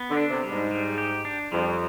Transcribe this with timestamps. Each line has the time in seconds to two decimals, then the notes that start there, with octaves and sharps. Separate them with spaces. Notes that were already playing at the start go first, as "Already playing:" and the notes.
Already playing: B3
0.10 D3
0.17 D4
0.30 C3
0.43 G3
0.51 G#2
0.71 G3
0.98 G4
1.25 D4
1.52 F2 G3